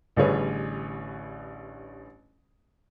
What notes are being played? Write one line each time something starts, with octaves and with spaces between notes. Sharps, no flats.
A1 D3 G3 G#4 B4 C#5